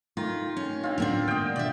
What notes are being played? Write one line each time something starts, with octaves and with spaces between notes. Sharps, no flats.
D#3 A3 F4
C#4
C4 D4 D#4 F4 F5
D2 A2 A#3 B3 D4
G#2 D#3 D#5 G5
B2 D5 E5